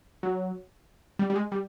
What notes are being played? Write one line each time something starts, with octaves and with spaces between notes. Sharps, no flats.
F#3
G3
G3
G#3
G3